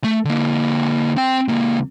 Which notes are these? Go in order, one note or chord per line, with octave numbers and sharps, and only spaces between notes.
A3
D3 A#3
C4 G5
C#2 A#3